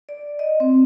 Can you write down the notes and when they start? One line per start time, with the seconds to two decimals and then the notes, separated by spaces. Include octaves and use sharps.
0.09 D5
0.39 D#5
0.60 C4